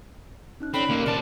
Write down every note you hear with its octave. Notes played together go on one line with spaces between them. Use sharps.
C#4 D#4 F#6
C4 A4 C#5 D5 B5
D#2 A#3
C3 D5 A5 F6